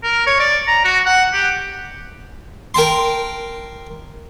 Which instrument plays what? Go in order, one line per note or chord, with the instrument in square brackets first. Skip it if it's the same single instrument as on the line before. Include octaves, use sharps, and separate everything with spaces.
[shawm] A#4
C#5
D5
A#5
F#4
F#5
G4
[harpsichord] A#4 G5 A5 C6